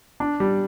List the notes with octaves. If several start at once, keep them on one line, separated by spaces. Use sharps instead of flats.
D4
G3